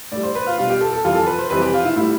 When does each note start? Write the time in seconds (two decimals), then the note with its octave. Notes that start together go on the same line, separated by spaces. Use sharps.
0.12 A2 G3 D5
0.23 C5
0.35 B4
0.47 F4
0.58 B2 G3 F4
0.70 G4
0.81 A4
0.93 A4
1.04 F2 E3 G3 F4
1.15 A4
1.27 B4
1.39 C5
1.50 F2 C3 E3 G3 B4
1.61 G4
1.74 F4
1.85 E4
1.96 A2 G3 E4